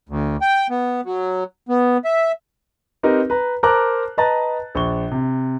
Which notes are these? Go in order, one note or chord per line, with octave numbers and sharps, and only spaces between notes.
D2
G5
B3
F#3
B3
E5
C4 D#4 G4 A#4 B4
B4 A#5
A#4 C5 A5 A#5 D6 F#6
B4 D#5 A5 A#5 F#6 A6
A#1 C#6 G7
C3